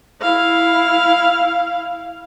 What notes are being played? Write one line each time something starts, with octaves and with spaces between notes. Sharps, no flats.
E4 F5